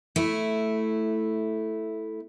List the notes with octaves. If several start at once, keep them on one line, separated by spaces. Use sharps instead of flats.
A3 E4